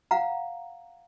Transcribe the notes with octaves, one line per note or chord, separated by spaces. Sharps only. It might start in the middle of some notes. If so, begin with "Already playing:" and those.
F5 F#5 A#5